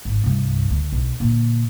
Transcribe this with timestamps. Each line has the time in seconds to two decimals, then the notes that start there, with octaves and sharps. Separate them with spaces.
0.05 G#1
0.24 C2 G2
0.70 D2
0.92 B1
1.20 A#2 D3